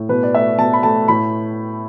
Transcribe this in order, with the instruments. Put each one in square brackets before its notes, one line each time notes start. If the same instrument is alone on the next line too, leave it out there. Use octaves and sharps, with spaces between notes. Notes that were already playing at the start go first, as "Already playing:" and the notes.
Already playing: [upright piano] A2
B2 B4
D5
A3 E5
B2 A5
B5
A3 A5
A2 B5